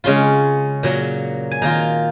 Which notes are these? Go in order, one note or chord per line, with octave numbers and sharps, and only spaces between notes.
C#3 G#3 C#4 F4 C6
A#2 F#3 A#3
G#5
D#3 A#3 F4 A#5